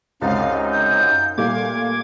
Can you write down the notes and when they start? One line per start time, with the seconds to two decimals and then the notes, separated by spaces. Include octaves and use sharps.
0.22 C#2 F#2 C3 D#4 F5 A6
0.72 G6
1.01 F5
1.38 A#2 G3 A3 F5 D6 G#6